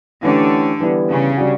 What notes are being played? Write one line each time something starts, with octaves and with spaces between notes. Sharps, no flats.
D3 E3 A3 C#4 G4
E3 G3 B3 E4
C#3
G3 D4 F#4